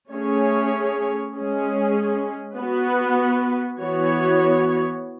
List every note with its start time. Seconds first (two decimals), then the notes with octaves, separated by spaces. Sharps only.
0.11 A3 C#4 G#4 C#5
1.34 G#3 C#4 G#4
2.57 B3 F#4 B4
3.80 E3 B3 F#4 C#5